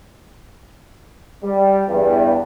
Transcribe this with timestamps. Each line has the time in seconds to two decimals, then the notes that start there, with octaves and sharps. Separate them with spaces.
1.42 G3
1.87 E2 G2